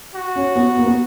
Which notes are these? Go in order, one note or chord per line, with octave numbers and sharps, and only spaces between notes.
F#4
C#4
B3
A#3
B3